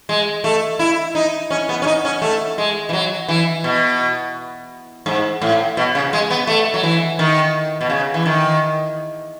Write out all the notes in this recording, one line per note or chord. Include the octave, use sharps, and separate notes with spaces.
G#3
A3
E4
D#4
C#4
B3
C#4
D#4
C#4
A3
G#3
E3
F#3
E3
B2
G#2
A2
B2
C#3
G#3
B3
A3
F#3
E3
D#3
B2
C#3
E3
D#3